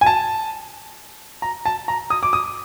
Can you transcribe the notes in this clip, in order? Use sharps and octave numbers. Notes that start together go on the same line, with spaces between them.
G#5
A5
A#5
A5
A#5
D#6
D6
D#6